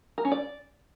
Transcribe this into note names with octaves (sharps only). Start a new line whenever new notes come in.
A#4
C#4
D5